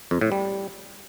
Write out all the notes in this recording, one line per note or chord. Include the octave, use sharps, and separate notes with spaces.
F2
A2
G3